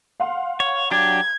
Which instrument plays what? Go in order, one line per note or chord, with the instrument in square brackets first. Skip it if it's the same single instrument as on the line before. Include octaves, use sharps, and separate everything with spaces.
[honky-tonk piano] F5 F#5 C6
[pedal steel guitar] C#5
[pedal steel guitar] F#3 D4 G4 [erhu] G#6